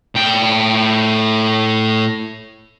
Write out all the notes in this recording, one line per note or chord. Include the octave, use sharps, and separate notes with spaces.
A2 G5